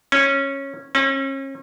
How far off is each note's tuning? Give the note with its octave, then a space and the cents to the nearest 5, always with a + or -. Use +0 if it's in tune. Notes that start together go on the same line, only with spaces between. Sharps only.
C#4 -10
C#4 -35